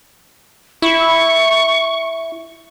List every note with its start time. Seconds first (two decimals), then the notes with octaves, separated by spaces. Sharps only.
0.82 E4 C#6